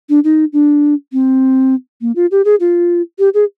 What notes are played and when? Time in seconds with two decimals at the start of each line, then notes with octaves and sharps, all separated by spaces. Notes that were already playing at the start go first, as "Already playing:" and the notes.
0.09 D4
0.24 D#4
0.53 D4
1.13 C4
2.01 A#3
2.16 F4
2.31 G4
2.45 G#4
2.60 F4
3.19 G4
3.34 G#4